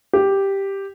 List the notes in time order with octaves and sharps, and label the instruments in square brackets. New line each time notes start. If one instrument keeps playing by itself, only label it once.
[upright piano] G4